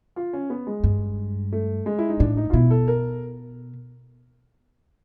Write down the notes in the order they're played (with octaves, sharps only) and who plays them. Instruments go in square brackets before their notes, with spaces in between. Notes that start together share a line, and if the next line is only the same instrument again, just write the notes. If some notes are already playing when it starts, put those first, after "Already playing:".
[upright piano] F4
C#4
B3
G#3
[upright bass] G2
[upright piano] A3
G#3
E4
D#4
[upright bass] A2 [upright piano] D4
[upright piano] D#4
F4
[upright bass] B2 [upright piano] E4
[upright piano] A4
A#4